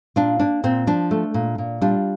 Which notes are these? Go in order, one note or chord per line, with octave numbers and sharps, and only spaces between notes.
A#2 D4 F4
A#3 D4
A#2 C4
F3 D4
A3
A#2
A#2
G3 D4 F4